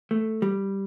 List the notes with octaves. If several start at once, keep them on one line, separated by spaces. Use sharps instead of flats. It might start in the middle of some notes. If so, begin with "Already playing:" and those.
A3
G3